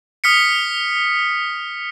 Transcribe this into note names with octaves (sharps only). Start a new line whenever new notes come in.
D#6 F6 B6 C#7